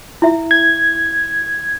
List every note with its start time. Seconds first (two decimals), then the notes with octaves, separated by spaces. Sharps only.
0.22 E4 E5
0.51 G#6